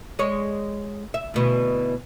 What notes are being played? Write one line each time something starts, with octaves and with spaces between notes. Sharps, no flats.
G#3 C#5
E5
D2 B2 E3